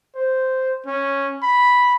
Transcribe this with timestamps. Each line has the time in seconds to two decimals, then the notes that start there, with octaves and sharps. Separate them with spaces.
0.15 C5
0.86 C#4
1.43 B5